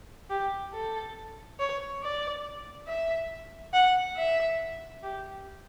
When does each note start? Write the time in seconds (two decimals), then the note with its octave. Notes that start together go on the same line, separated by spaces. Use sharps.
0.30 G4
0.73 A4
1.59 C#5
2.02 D5
2.87 E5
3.73 F#5
4.17 E5
5.03 G4